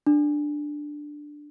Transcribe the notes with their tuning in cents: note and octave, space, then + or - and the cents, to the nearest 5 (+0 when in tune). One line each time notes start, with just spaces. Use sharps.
D4 +5